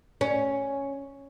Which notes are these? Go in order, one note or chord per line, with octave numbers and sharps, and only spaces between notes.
C#4